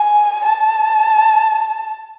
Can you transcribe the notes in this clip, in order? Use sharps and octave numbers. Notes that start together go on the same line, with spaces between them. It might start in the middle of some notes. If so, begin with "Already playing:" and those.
Already playing: G#5
A5